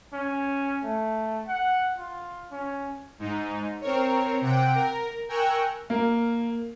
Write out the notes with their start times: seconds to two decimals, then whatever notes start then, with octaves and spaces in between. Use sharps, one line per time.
0.13 C#4
0.83 A3
1.47 F#5
1.98 F4
2.51 C#4
3.19 G#2 D#4
3.81 C4 A#4 C#5
4.41 C3 F#5 G5 D7
4.75 A#4
5.29 A#4 G5 G#5 C#6 E6 F#6
5.90 A#3